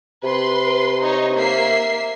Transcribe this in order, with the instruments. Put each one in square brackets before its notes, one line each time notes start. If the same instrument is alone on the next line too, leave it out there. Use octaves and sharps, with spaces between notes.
[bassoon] C3 [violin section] B4 C6
[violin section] D#4 C#5
A#3 E5 C7